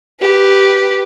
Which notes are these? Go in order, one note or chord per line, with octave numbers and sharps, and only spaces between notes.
G4 B4